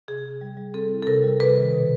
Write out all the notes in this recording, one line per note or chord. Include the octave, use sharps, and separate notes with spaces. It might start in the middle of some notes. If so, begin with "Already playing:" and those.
C3 G#4
C3
G3
G3
C4 A4
E4
A4
C3 A#4
G3
C3 B4
D#3
B2